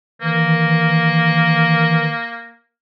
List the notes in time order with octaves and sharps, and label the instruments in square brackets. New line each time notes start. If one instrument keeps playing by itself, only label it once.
[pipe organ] D#3 E3 [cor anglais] A#3